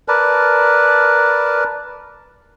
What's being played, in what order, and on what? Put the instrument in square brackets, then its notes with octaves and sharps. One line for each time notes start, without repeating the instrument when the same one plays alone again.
[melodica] A#4 B4 D5 A5